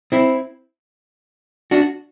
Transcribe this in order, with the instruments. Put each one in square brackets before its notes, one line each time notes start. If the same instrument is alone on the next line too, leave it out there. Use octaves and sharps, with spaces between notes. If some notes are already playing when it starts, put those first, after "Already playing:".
[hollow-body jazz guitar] C4 E4
D4 F#4